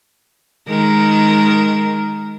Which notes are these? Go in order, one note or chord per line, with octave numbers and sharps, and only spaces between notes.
D#3 G#3 A#4